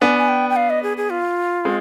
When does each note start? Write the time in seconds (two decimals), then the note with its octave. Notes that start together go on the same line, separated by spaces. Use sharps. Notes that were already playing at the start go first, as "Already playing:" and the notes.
0.01 B3 D4 G#5
0.18 G#5
0.29 G5
0.50 G5
0.56 F5
0.70 D#5
0.83 G#4
0.97 G#4
1.10 F4
1.65 G#3 C4